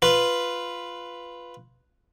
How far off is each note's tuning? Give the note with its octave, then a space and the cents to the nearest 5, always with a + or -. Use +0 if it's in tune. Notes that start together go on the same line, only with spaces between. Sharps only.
F4 +0 B4 +0